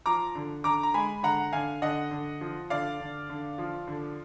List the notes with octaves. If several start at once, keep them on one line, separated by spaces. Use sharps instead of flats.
F3 A#5 D6
D3
D3 A#5 D6
A#5
G#3 G#5 B5
D3 F#5 A#5
D3 F5 G#5
D3 D#5 F#5
D3
F3
D3 D5 F5
D3
D3
F3
D3